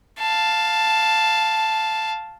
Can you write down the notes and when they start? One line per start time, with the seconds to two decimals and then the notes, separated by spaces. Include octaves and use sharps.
0.19 F5 A5